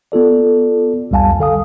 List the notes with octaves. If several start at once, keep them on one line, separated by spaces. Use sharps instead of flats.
B3 F4 A4 D5
C2 F2 G3 F5 G#5 A5
D3 A4 F5 D#6